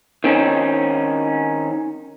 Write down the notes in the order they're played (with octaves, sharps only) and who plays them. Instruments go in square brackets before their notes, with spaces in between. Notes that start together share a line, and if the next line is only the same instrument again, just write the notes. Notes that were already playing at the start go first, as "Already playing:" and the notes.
[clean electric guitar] D#3 C4 C#4 D#4